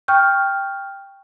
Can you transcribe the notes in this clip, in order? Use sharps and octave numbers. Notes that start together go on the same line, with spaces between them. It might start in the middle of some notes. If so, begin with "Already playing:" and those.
G5 C#6 F6 G6